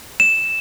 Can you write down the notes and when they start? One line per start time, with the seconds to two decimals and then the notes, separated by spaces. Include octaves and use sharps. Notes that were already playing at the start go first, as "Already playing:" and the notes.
0.20 E7